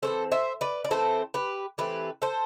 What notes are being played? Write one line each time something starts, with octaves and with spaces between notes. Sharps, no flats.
E3 A3 C4 A4 C5
C5 E5
B4 D5
D5
E3 A3 C4 A4 C5
G4 B4
E3 A3 C4 G4 B4
A4 C5